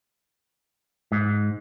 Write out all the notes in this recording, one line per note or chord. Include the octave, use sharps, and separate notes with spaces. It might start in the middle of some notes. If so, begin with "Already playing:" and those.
G#2